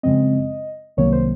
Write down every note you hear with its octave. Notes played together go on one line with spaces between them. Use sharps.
F#2 C#3 F3 G#3 C4 D#5
C2 C3 D#3 F#3 A#3 C#5
C5